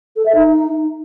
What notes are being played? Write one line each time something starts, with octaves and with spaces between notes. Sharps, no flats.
A4
E5
D#4